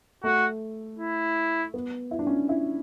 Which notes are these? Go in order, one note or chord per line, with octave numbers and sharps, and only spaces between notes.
A3 F#4
E4
B3
E4
D4
C#4
D4
E4